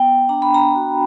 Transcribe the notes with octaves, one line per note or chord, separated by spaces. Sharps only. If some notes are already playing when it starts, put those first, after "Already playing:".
Already playing: B3 G5
D4 A#5
B5
A#5
F#4